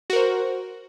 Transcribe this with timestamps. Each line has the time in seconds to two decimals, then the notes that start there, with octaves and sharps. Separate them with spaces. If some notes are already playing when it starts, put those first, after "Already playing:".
0.10 F#4
0.13 A#4
0.16 C5